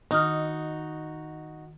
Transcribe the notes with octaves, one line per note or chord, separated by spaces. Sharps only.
D#3 D#4 F#4 D#6 F6